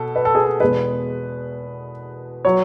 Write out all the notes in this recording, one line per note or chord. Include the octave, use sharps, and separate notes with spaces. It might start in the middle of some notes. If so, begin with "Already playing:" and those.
Already playing: B2 A4
B4
A4
G#4
A4
E2 B2 G#3 B4
F#3 C#5